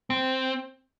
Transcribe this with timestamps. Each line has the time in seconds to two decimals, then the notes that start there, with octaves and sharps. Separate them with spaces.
0.10 C4